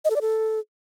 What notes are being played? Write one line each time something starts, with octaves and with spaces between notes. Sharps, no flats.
D#5
A4
D5
A4